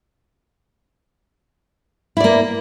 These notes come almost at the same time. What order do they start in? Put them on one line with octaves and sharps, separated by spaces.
E4 D5 A#3